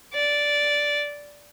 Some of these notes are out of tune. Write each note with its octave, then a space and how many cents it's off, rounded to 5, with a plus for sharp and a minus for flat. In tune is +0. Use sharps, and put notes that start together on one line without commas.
D5 -10